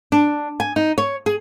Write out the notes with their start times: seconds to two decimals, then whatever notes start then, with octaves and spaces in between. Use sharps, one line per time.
0.12 D4
0.60 G#5
0.76 D#4
0.98 C#5
1.26 G#4